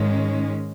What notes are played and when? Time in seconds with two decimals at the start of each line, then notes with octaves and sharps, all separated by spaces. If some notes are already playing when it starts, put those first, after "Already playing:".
Already playing: G#2 D#3 G#3 C#4